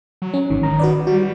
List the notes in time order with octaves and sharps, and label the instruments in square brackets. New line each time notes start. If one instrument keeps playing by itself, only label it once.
[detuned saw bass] F#3
[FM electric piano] C#4
[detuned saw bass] G#1 [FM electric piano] D#3
[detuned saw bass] D#3 [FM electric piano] A#5
[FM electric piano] F#4 B4 D5
[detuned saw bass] G3 [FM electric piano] F#4